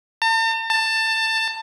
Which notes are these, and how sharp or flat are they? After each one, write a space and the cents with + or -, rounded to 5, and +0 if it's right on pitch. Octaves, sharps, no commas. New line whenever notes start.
A5 +45
A5 +20